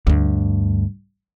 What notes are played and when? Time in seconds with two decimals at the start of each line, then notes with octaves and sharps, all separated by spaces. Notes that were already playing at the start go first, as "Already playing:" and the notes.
0.07 D2 G2